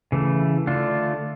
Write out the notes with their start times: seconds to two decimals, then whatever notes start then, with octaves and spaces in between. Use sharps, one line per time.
0.12 C#3 E3 A3
0.67 D3 A3 D4 F4